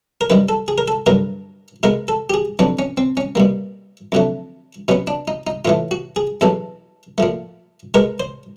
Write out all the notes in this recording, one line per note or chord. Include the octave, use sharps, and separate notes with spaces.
A#4
F#2 D#3 G3 B4
A4
G#4
A#4
A4
G2 D3 F#3 B3 A#4
B2 G#3 B3 A#4
A4
G4
G#4
F2 D3 F#3 B3 D4
C#4
C4
C#4
B2 G3 A#3
F2 D3 F#3 A3
B2 F#3 B3 C#4
D4
D#4
D#4
A2 E3 A3 F4
F#4
G#4
E2 B2 F#3 A4
A#2 F3 A3
B2 G#3 B3 A#4
C5